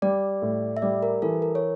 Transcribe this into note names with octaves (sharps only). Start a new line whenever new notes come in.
G3 D5
A2
E5
G3 D5
A#4
E3 A4
A#4
C#5